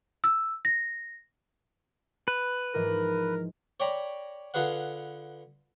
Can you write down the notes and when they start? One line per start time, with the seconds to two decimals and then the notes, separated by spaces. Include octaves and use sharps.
0.24 E6
0.65 A#6
2.28 B4
2.74 G#2 E3 F3 A#4
3.80 C#5 D5 G5 A#5 B5
4.54 D3 F4 G#4 B4 F#5